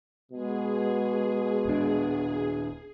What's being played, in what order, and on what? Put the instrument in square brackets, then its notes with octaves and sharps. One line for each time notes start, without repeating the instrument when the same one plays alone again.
[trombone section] B2 [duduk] G#3 [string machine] G#4
[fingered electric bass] D#1 D4